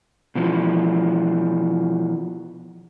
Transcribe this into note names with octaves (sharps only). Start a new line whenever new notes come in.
B2 E3 F3